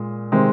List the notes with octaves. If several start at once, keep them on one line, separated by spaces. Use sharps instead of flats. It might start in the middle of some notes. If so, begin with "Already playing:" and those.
Already playing: A#2 G#3
C3 D#3 G#3 C4